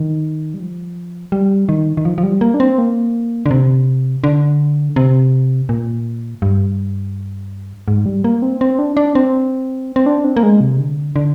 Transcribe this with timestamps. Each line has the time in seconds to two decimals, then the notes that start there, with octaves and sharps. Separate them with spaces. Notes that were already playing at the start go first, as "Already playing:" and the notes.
Already playing: D#3
0.54 G3
0.60 F3
1.32 G3
1.69 D#3
1.97 D#3
2.05 F3
2.18 F3
2.23 G3
2.41 A#3
2.54 D4
2.60 C4
2.78 A#3
3.46 D3
3.51 C3
4.24 D3
4.96 C3
5.69 A#2
6.42 G2
7.88 G#2
8.06 G3
8.24 A#3
8.42 C4
8.61 C4
8.79 D4
8.97 D4
9.15 C4
9.96 C4
10.06 D4
10.24 C4
10.37 A#3
10.43 G#3
10.61 C3
10.79 D3
11.16 D3